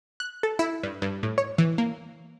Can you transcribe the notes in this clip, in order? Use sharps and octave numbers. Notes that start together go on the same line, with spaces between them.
F#6
A4
E4
G2
G2
A2
C#5
E3
A#3